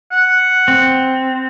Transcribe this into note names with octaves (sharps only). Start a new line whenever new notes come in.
F#5
C4